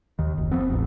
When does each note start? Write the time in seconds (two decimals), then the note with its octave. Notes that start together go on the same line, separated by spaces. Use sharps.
0.19 D#2 D#3
0.38 F#1
0.51 F3 B3 C4
0.70 D#1 A1